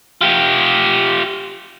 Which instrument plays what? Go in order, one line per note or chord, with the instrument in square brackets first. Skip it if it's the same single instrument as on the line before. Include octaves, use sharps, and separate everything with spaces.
[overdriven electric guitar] F4 G4